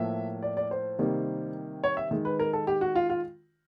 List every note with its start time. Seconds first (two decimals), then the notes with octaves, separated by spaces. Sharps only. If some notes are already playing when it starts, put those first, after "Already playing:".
Already playing: A2 F3 A#3 E5
0.43 D5
0.57 D5
0.71 C5
0.99 C3 D#3 G3 A#3
1.84 C#5
1.97 E5
2.11 D#3 G#3
2.25 B4
2.39 A#4
2.53 A4
2.67 G4
2.81 F#4
2.95 F4
3.10 F4